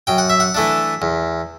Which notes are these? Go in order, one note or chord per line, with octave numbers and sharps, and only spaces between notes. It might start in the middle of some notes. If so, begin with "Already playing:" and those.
F#2 G5
F#5
E5
F#5
E3 A3 D4
E2